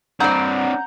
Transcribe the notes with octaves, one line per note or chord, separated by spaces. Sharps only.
G2 C4 D4 D5 F#5 A#5 G6